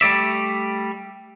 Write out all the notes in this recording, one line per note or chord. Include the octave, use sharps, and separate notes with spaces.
G3 A3 D5 E5